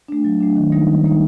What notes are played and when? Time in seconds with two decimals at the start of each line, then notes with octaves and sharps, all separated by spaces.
0.08 A3 D4
0.25 F#3
0.40 A3 D4
0.56 D#3
0.72 G3 A#3 D#4
0.88 D#3
1.04 G3 A#3 D#4